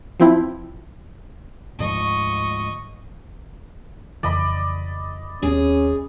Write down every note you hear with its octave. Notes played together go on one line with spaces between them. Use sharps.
F3 C4 E4
D2 G#2 F3 D#5 C#6
F2 C#3 E3 D5 D#5 B5
D#2 C4 C#4 G#4